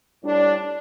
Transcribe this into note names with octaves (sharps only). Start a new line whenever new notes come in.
A2 G3 D4